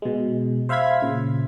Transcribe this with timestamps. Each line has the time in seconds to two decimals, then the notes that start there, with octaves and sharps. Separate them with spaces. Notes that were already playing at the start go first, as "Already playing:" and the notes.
0.02 B2 G#3
0.69 C5 E5 F5 B5 G#6 B6
1.02 A#2 C#3